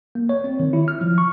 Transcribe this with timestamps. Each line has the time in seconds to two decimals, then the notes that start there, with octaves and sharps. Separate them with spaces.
0.15 A#3
0.29 C#5
0.44 C4
0.60 D#3
0.73 E4
0.88 F6
1.01 F3
1.18 C#6